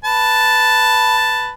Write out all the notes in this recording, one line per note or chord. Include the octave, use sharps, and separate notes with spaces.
B4 A5